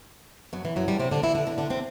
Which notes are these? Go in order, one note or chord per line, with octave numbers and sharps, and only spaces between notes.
F#2 F#3
E3
F#2 F#3
G2 G3
C3 C4
D3 D4
E3 E4
D3 D4
D3 D4
D3 D4
C3 C4